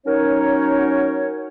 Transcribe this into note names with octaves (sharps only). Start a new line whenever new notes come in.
F#3 C#4 D#4 A#4 C#5